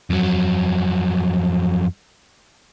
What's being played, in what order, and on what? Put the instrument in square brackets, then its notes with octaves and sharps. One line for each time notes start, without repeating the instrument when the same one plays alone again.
[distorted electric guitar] F2 F#3